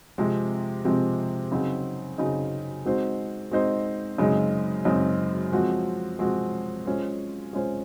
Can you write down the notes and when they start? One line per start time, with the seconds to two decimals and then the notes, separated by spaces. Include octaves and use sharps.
0.18 C3 F3 G#3 C4
0.85 C3 F3 G#3 C4
1.52 C#3 F#3 C4 D#4 F#4
2.18 C#3 F#3 C4 D#4 F#4
2.86 G#3 C4 D#4 F#4 C5
3.51 G#3 C4 D#4 F#4 C5
4.18 F#2 C#3 G#3 C4 D#4
4.85 F#2 C#3 G#3 C4 D#4
5.52 F3 G#3 C4 F#4
6.19 F3 G#3 C4 F#4
6.86 G#3 C#4 F4 C5
7.53 G#3 C#4 F4 C5